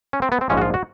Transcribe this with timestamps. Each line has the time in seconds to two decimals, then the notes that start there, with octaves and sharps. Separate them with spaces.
0.13 C#4
0.22 C4
0.32 B3
0.41 C4
0.49 A#1 G#2 F3 G#3 C#4
0.57 F#4
0.61 F4
0.74 F#4